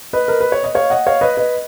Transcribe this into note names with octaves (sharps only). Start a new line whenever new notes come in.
B4 D#5
A#4
B4
C#5
D#5
C#5 F5
D#5 F#5
C#5 F5
B4 D#5
B4 D#5